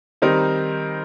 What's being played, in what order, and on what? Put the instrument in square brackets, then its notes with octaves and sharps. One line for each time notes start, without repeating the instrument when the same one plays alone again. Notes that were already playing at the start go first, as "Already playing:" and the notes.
[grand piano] D#3 G3 C4 D#4 A#4